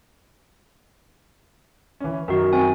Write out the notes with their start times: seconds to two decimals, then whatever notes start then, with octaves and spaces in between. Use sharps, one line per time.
2.00 E3 C#4
2.28 F#2 D#3 F#4 A#4
2.53 C4 G#5